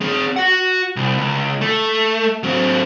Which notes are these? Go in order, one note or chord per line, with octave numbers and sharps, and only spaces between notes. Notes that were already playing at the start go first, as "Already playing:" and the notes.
C4 G#4
F#4 F#5
C2
C#2
A3
F#3 C4